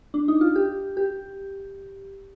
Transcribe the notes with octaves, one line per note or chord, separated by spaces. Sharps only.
D4
D#4
F4
G4
G4